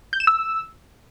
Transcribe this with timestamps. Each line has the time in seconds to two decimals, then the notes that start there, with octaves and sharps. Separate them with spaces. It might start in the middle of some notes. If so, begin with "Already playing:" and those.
0.13 G6
0.20 E7
0.27 E6